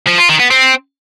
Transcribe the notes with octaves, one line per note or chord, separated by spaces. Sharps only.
F3
F4
D#3
B3
C4